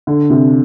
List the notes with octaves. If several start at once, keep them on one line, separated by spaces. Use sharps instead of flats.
D3
C3